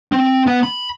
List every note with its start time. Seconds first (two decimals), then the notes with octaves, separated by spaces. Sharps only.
0.12 C4
0.47 B3 F#5
0.63 B5